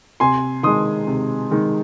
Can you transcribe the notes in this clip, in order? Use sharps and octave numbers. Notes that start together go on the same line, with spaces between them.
C3 G#5 C6
D#3 G#3 C6 D#6
C3
D#3 G#3